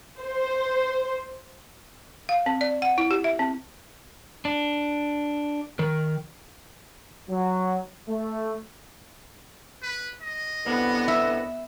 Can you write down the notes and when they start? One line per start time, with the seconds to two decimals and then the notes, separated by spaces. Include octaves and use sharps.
0.20 C5
2.29 F5
2.46 C4
2.61 D5
2.82 F#5
2.98 E4
3.11 G4
3.24 E5
3.39 C4
4.45 D4
5.79 D#3 A#4
7.29 F#3
8.09 A3
9.82 B4
10.22 D#5
10.66 C2 D3 B3 B4
11.08 E5